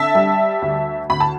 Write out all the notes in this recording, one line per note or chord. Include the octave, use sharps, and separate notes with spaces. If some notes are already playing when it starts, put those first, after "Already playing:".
Already playing: D3 E5 A5
G3
D2
D2 B5
A5